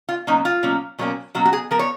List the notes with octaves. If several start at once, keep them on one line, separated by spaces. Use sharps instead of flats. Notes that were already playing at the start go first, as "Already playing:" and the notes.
F4
B2 F#3 A#3 C#4 D#4
F4
B2 F#3 A#3 C#4
B2 F#3 A#3 C#4
B2 F#3 A#3 C#4 F#4
F#4
G#4
F3 B3 A#4
C#5